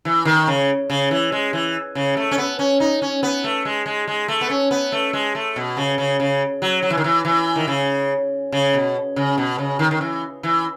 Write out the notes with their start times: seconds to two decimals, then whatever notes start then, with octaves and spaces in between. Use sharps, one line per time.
0.05 E3
0.25 D#3
0.47 C#3
0.90 C#3
1.11 E3
1.32 G#3
1.53 E3
1.95 C#3
2.17 A3
2.31 C#4
2.38 B3
2.59 C#4
2.80 D#4
3.02 C#4
3.23 B3
3.44 A3
3.65 G#3
3.86 G#3
4.08 G#3
4.28 A3
4.41 B3
4.50 C#4
4.71 B3
4.92 A3
5.13 G#3
5.35 A3
5.56 B2
5.77 C#3
5.98 C#3
6.20 C#3
6.62 F#3
6.82 F#3
6.90 E3
6.97 D#3
7.04 E3
7.25 E3
7.56 D#3
7.68 C#3
8.52 C#3
8.74 B2
9.16 C#3
9.38 B2
9.58 C#3
9.79 D#3
9.91 D#3
10.01 E3
10.43 E3